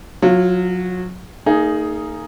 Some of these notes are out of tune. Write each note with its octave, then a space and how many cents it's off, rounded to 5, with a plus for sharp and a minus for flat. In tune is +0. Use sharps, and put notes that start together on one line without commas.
F#3 -25 F4 +0
A#3 -35 D#4 +0 G#4 +5